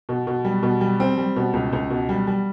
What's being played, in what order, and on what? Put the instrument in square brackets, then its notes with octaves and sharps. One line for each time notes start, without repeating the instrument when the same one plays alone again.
[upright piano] B2
B2
G3
B2
G3
C4
G3
B2
C#2
C#2
B2
G3
G3